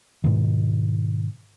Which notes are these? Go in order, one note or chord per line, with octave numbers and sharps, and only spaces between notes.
G#2 B2 D#3